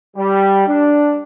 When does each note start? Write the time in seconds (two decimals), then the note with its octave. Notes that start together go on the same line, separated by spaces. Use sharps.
0.16 G3
0.68 D4